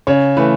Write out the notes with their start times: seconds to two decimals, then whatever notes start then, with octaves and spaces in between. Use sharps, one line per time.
0.07 C#3 C#5
0.37 E3 A3 B4